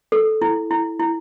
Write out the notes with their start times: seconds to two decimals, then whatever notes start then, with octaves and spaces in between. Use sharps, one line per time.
0.12 A4
0.42 E4
0.71 E4
1.00 E4